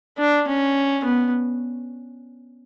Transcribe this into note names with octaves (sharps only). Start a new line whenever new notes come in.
D4
C#4
B3